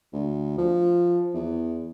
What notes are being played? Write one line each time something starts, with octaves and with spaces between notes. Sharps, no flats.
D2
F3
E2